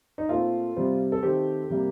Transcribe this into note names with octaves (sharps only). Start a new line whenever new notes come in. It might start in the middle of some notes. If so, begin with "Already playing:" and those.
D#4
A#2 A3 C4 F4
C3 G3 C4
A4
D#3 A3 C4 G4
C3 G3 A#3